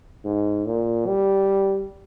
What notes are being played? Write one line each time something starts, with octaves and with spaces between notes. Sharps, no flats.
G#2
A#2
G3